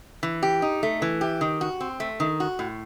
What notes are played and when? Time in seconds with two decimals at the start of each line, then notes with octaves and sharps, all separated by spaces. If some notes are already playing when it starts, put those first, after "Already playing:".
0.23 E3
0.43 G4
0.62 D#4
0.83 A3
1.02 E3
1.21 G4
1.41 D#3
1.61 F#4
1.81 C4
2.00 A3
2.20 D#3
2.40 F#4
2.59 A2